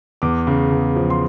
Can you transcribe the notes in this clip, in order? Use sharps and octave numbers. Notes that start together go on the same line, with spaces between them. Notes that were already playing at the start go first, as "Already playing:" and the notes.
E2 D6
C#3
E2
F3
C6